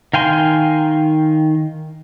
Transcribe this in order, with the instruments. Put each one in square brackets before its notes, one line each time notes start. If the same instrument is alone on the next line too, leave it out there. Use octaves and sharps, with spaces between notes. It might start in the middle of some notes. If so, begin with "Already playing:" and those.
[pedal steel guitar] D#3 F5 G5 G#5 C6